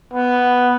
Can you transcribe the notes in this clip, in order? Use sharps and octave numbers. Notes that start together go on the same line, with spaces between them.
B3